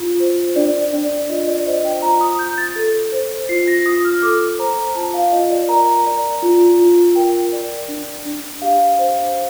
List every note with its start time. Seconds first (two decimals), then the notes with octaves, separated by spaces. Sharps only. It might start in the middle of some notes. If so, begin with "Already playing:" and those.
Already playing: D4 F4
0.20 C5
0.56 D4 D5
0.93 D4 D5
1.29 F4 D#5
1.48 D5
1.66 C5 D#5
1.85 G5
2.02 F4 A#5
2.21 D#6
2.39 F4 G6
2.58 A6
2.76 A4
3.12 C5
3.49 F4 C7
3.67 A#6
3.86 F4 D#6
4.05 F6
4.22 A4 D6
4.58 C5 A#5
4.95 F4 A5
5.14 F5
5.32 F4 D#5
5.50 D5
5.69 A#4 A#5
6.06 D5
6.42 F4
6.79 F4
7.15 A#4 G5
7.52 D5
7.88 D4
8.25 D4
8.62 G4 F5
8.99 C5